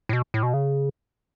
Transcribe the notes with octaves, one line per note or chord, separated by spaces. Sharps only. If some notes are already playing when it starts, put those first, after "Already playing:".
A2
B2
A2
B2
C#3